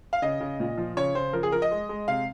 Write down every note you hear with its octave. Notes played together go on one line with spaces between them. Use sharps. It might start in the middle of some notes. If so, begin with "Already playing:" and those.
F5
C#3 D#5
C#3
A#2
F3
C#3 C#5
C#3 C5
F3 A#4
G#4
F3 A#4
D#5
G#3
G#3
C3 F5